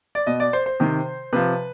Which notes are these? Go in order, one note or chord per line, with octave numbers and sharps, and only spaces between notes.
D5
B2 D#5
D5
C5
C5
C3 D#3
C3 F3 B4